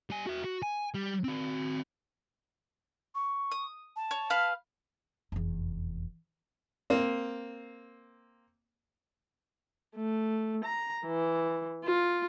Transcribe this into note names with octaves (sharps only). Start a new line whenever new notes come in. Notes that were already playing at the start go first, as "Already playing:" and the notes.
G3 G#5
F#4 E5
F#4
G#5
G3
C4 F#4
C#6
D#6
A5
C#5
B4 F5 F6
F1 E2
A#3 C4
A3
A#5
E3
F4